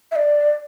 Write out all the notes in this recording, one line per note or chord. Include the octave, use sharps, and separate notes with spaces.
E5
D5